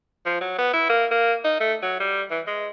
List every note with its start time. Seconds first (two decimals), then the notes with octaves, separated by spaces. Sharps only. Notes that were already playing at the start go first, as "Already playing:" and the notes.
0.25 F3
0.41 F#3
0.58 B3
0.73 E4
0.89 A#3
1.11 A#3
1.44 D#4
1.60 A3
1.82 F#3
2.00 G3
2.31 E3
2.47 G#3